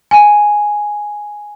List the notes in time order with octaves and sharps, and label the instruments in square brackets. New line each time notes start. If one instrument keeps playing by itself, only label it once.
[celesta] G#5